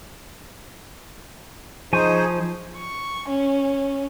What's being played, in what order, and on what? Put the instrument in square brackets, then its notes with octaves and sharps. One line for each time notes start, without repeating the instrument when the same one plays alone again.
[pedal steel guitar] F3 G#5 C#6 [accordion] D#4 G#4 C5
[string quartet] C#6
C#4